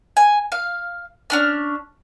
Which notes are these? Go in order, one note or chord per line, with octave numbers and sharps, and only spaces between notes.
G#5
F5
C#4 D4 F6